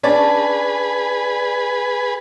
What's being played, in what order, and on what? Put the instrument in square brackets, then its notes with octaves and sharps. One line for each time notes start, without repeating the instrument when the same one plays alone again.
[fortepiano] C#4 D5 [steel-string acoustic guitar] D4 [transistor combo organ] G#4 B4